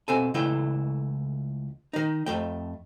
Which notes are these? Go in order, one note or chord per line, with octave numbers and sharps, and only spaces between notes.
B2 C4 A4 G#5
C#2 C#3 E3 A3 E4 G5
D#3 D#4
F2 A3 G5